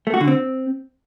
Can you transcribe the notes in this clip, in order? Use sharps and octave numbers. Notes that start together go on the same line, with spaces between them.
A3
F#4
D3
C4